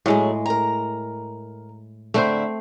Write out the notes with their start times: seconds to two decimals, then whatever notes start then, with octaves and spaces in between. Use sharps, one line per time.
0.06 A2 F#3 G#3 A3 G#4
0.46 A#4 A#5
2.14 D3 A3 C4 E4 C5 E5